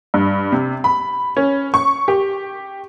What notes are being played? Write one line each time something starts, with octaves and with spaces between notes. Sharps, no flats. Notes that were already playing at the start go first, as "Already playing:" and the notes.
G2
C3
B5
C#4
C#6
G4